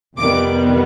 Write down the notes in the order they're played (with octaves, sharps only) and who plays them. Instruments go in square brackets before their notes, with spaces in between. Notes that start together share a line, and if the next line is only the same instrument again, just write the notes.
[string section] F2 C3 D#3 G3 B3 D6